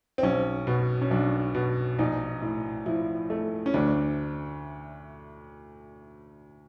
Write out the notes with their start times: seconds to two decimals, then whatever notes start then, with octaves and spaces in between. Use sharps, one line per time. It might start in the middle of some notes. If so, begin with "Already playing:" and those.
0.18 C4
0.23 B1 C#4
0.67 B2
1.02 C#4
1.11 B1 D4
1.55 B2
1.99 A#1 D#4
2.42 A2
2.86 F3 E4
3.30 A3
3.66 C#4
3.74 D2 D4